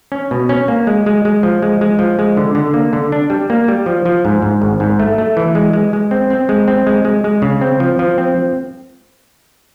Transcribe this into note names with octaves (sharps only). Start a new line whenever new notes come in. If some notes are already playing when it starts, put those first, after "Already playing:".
C#4
B2
C#4
A#3
G#3
G#3
G#3
F3
G#3
G#3
F3
G#3
D3
D3
A#3
D3
D4
G3
A#3
G3
F3
F3
G#2
G#2
G#1
G#2
A3
A3
E3
G#3
G#3
G#3
C4
C4
G#3
C4
G#3
G#3
G#3
C#3
C4
F3
F3
C4